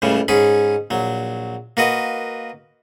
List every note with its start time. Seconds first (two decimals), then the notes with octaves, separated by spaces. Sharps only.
0.02 C#2 A2 C#3 G3
0.28 G#2 C#4 G#4 B5
0.90 A#1 F#3
1.77 A#3 F#4 B4 D#5